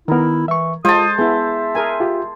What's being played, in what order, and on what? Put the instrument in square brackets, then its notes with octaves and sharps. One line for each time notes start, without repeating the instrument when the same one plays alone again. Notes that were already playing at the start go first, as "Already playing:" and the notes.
[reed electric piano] D#3 B3 [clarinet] E4 [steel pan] A#4
[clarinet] E3 [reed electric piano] E5 C#6
[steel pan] G#3 [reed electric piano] F4 [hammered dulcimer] C5 A5 [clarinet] D#6
[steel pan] B3 E4 [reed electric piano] G#4 [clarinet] E5
[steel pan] G#4 A#4 G#5
[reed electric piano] F4 G4